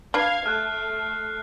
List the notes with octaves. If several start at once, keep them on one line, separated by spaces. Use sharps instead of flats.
D4 B4 F5 F6 G#6 C7
A3 F6 F#6